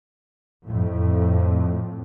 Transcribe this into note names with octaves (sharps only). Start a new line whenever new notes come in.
F2 A2